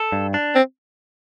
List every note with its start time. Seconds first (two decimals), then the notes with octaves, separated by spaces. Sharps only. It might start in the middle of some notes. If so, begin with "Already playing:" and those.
Already playing: A4
0.12 G2
0.34 D4
0.55 C4